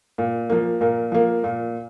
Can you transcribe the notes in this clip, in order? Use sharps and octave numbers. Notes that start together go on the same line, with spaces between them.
A#2
F3 A#3
A#2 A#4
F3 A#3
A#2